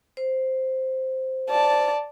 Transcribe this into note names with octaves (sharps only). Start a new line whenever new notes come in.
C5
D5 A5